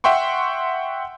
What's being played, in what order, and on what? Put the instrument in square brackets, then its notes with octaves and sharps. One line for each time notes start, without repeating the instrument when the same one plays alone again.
[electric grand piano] E5 F#5 G5 C6 C#6